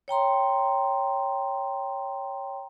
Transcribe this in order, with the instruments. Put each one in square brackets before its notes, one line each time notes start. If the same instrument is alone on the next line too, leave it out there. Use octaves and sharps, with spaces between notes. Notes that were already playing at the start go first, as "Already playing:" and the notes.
[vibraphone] C#5 G5 A#5 C6